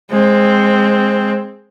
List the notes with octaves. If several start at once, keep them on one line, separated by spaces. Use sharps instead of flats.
G#3 C4